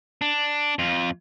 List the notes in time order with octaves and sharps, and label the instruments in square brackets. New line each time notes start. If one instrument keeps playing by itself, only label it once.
[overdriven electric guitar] D4
F2 F4